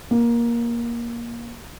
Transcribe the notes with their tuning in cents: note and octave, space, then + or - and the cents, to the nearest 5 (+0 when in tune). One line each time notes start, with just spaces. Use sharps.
A#3 +15